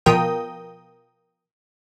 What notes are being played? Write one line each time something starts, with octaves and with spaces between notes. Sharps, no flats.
B2 F3 A#4 G5 D#6